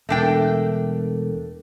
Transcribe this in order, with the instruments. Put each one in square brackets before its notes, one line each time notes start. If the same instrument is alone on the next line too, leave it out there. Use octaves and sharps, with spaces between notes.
[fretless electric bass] E1 [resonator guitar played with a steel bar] A3 D4 G5 [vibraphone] A4 A#4